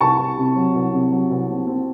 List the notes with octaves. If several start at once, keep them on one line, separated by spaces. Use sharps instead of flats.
C2 A5 C#6
C2
C3
F#3
C2
C3
F#3
C2
C4
C4